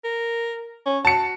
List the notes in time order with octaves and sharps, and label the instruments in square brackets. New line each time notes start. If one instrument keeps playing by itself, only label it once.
[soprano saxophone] A#4
C#4
[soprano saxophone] F#4 [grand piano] A5 C#7